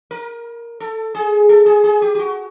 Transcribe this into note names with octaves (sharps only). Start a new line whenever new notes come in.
A#4
A4
G#4
A4
G#4
G#4
G4
G4
F#4